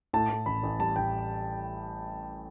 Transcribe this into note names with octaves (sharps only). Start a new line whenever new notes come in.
A2 A5
A2
A1 B5
A1
G3 A5
A1 G5